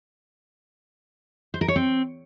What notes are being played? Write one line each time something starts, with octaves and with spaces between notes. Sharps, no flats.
C5
A#4
C#5
C4